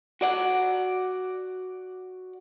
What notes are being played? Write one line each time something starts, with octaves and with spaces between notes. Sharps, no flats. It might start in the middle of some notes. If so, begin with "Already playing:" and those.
F#4 D5 F#5